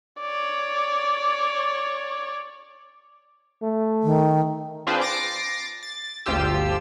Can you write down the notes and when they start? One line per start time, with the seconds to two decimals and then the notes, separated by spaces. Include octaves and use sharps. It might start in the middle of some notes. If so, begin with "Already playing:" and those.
0.21 C#5 D5
3.63 A3
4.03 D#3
4.87 C4 D4 F4 G#4 B4 C5
5.01 D6 A6 A#6 C7 D7
5.83 A6
6.26 G1 D2 F3 F4 G4 E6